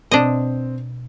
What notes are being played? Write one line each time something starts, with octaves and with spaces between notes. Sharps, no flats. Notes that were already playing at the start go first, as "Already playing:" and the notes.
B2 C4 D4 D#5